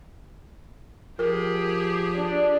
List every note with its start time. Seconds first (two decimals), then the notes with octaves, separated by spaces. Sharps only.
1.19 F3 G4 G#4 A#4
2.16 D4